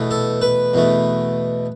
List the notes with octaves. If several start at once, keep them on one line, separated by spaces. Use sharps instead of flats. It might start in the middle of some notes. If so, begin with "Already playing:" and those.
Already playing: E2 B2 A3
A4
B4
E2 B2 A3